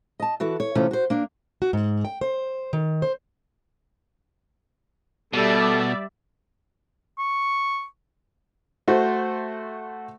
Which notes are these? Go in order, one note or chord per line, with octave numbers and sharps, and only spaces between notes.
D#5 A5
E3 F#4 A4
C#5
C3 E3 A3 C#4 F4
F#4 C5
A#3 D4
F#4
G#2
G5
C5
D#3
C5
B2 G3 A4 D5 E5
C#6
A3 F#4 C5